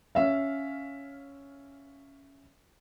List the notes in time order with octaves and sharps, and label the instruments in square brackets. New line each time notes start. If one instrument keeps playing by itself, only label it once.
[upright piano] C#4 E5 F5